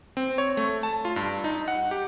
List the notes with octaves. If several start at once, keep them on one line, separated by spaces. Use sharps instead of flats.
C4
C#5
A3
A5
F4
G2
D#4
F#5
G4